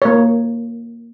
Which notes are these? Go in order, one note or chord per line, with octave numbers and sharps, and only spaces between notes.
A#3 C#5